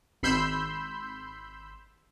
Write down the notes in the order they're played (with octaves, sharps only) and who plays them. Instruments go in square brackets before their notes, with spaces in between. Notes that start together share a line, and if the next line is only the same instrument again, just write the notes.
[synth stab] G#1 B5 C6 E6 G6